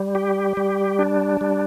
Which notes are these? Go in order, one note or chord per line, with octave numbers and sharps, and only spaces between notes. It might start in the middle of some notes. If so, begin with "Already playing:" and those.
Already playing: G3
G4
G3
D4
G3